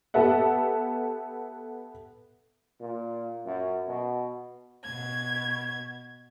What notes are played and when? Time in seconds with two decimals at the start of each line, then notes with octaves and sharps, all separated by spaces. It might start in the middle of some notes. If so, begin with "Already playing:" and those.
0.14 B3 G4 A4 B4 E5 F#5
2.81 A#2
3.46 F#2
3.88 B2
4.84 B2 G#6